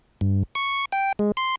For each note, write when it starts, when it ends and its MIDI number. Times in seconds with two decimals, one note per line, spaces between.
0.21 0.43 43
0.55 0.85 85
0.92 1.13 79
1.19 1.32 56
1.37 1.55 84